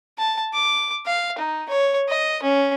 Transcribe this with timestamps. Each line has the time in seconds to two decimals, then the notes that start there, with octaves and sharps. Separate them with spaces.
0.18 A5
0.53 D6
1.06 F5
1.38 D#4
1.69 C#5
2.09 D#5
2.43 C#4